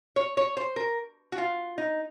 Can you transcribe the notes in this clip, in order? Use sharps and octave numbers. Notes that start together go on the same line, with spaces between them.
C#5
C#5
C5
A#4
F#4
F4
D#4